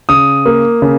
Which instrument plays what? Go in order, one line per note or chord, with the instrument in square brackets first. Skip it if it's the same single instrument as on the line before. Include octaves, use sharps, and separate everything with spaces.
[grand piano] C#3 D#6
A#3
C#3